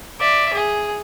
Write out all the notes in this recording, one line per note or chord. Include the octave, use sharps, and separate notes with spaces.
D5 E5
G#4